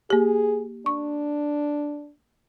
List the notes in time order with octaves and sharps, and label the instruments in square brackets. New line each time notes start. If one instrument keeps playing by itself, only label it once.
[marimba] A#3 G4 [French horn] G#4
[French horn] D4 [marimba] C#6